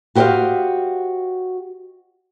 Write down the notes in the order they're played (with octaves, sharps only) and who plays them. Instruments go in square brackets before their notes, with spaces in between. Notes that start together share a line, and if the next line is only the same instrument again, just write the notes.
[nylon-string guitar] F#4 G4 C5 D5 D#5 F5